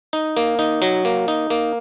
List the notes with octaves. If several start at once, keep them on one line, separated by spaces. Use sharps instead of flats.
D#4
A#3
D#4
F#3
A#3
D#4
A#3